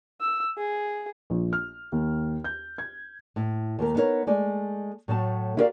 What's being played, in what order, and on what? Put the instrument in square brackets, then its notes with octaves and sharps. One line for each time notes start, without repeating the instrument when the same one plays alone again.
[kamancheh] E6
G#4
[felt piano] A#1
F6
D#2
G6
G#6
[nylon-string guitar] A2
D#2 A3 A#4
B3 D#4 F4 A#4 C#5
G#3 A3 D5
A2 F#3 A3 A5
E4 F#4 G4 A#4 D5 F5